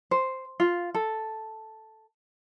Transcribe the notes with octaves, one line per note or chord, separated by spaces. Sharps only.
C5
F4
A4